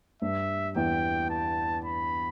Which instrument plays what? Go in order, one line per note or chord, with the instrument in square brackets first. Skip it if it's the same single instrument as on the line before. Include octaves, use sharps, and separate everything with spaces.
[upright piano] G2 [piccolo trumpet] E5
[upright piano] E2 E3 [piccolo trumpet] G5
[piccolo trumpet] A5
B5